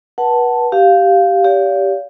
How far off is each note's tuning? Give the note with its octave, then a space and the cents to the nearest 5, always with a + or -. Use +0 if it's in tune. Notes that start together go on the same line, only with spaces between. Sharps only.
B4 -30 F#5 +15 A5 +0
G4 -10 F5 +0
G4 +0 D5 -45 F5 +0